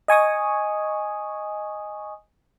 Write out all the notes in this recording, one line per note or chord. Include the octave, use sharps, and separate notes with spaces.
D#5 G#5 C#6 D#6